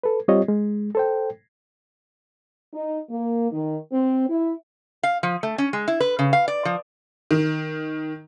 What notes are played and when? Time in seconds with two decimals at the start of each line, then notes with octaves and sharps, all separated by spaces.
0.03 A4 B4
0.28 G3 C4 F4 G4 C#5 D#5
0.48 G#3
0.95 A4 C5 G5
2.74 D#4
3.09 A#3
3.52 D#3
3.93 C4
4.29 E4
5.03 F5
5.23 F3
5.43 A3
5.58 C#4
5.73 G#3
5.88 E4
6.00 B4
6.19 C#3
6.33 F5
6.48 D5
6.65 F3
7.31 D#3